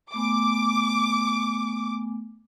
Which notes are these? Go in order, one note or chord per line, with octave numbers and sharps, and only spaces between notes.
A3 B3 G#5 D6